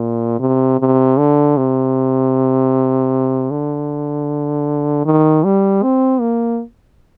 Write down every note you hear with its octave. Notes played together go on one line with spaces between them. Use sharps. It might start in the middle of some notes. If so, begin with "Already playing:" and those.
Already playing: A#2
C3
C3
D3
C3
D3
D#3
G3
C4
A#3